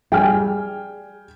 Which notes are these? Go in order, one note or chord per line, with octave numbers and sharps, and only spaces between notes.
G3 G#4 G5 G#5 F6